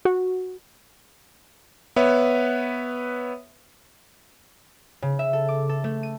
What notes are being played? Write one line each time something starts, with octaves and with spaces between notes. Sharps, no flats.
F#4
B3 B4 C#5 E5
C#3
E5
A4
D6
A4
A3
D#7